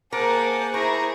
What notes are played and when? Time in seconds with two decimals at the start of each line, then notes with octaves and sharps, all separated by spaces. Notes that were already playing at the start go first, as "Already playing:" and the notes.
0.12 A#3 G#4 A#4 C5 F#5 A5 D6
0.74 E4 G#4 A#4 A#5 C#6